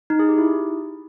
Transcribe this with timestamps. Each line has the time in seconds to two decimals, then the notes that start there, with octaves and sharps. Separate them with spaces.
0.10 D#4
0.19 G#4
0.29 G4
0.38 E4